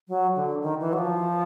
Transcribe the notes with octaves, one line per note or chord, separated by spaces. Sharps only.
F#3
D3
D#3
E3
F#3
F3